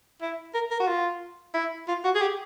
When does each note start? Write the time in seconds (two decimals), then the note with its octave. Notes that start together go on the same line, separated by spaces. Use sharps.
0.21 E4
0.54 A#4
0.71 A#4
0.80 F#4
0.87 F4
1.54 E4
1.88 F4
2.04 F#4
2.15 G#4
2.21 G4